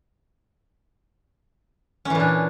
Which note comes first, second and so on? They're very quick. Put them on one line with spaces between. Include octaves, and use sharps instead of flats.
C#4 E3 A#2 D4